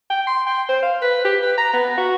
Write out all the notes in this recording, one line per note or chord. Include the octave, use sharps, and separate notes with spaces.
G5
C6
G5
C5
F5
B4
G4
B4
A#5
B3
F#4